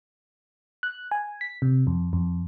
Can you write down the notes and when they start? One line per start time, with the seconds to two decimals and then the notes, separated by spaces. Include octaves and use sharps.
0.83 F#6
1.11 G#5
1.41 B6
1.62 C3
1.87 F2
2.13 F2